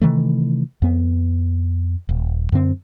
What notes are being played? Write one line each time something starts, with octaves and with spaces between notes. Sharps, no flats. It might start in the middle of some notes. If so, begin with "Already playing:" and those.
C3 D#3 E3 A3
F2 B3
D#1
F#2 D3 C4